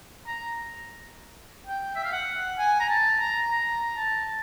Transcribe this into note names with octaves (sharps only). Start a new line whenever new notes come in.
A#5
G5
E5
F5
F#5
G#5
A#5
A5
A#5
A#5
A5